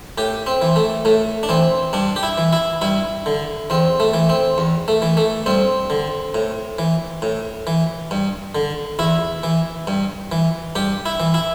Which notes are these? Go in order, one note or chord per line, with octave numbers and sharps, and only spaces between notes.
A2 G4
C4
E3
A3
A2 A3
D4
E3 C4
G2 D4
G4
E4
E3
E4
G2 E4
D3
E2 C4
A3
E3
C4
E2
A3
E3
A3
G2 C4
D3
A2
E3
A2
E3
G2
D3
E2 E4
E3
G2
E3
G2 G4
E4
E3
E4